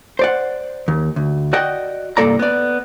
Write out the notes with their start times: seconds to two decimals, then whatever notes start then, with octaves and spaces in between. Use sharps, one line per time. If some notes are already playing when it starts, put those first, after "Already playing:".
0.19 C5 D5 F#5
0.88 D#2
1.16 D2
1.53 F#4 D5 D#5 F#5 G5
2.17 C2 G2 A#3 A4 D5 A#5
2.39 B3 D5